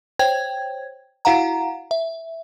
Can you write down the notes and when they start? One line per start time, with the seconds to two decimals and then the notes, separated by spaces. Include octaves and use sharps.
0.19 C5 C#5 G5 G#6
1.25 E4 F#4 F5 F#5 A#5
1.91 E5